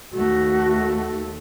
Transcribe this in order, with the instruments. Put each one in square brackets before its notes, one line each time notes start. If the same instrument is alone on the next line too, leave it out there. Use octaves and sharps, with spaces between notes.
[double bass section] D#2 A3 [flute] F#4